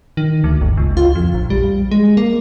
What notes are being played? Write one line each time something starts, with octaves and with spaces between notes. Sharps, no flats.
D#3
D2
G1
C#2
F4
F2
A#1
G3
G#3
A#3